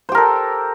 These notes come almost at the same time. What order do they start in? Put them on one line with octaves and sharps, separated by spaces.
C5 G4 A#4 A4